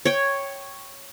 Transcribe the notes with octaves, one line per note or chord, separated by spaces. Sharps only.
C#5 G5